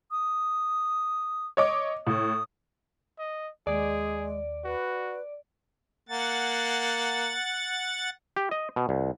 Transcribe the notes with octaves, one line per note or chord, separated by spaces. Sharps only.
D#6
C#5 D#5 D6
A2 D#6
D#5
D#2 G#3 G#4 D5
F#4 B4
A#3 F#5 A6
G4
D#5
B2
C2